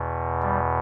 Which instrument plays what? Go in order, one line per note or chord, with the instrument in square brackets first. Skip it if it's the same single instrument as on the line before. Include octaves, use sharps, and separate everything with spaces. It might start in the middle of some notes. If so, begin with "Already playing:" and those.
Already playing: [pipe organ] E2 B2
G3